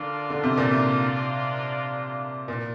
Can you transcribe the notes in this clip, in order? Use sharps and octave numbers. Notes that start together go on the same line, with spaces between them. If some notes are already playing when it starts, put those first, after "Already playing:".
Already playing: D3 D4 F4 A#4 D5 F5
D3
C3
A#2
C3
A#2